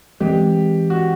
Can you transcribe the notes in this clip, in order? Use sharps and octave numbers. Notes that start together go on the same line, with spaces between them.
E3 G#3 C4 G4
F#4